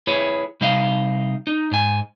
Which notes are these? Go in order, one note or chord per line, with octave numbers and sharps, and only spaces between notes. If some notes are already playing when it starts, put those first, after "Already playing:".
E4 G#4 B4 C#5
C3 G3 D#4 D#5 F5
D#4
G#2 G#5